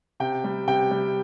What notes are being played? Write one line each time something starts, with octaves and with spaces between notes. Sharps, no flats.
C3 G5
G3
C3 G5
G3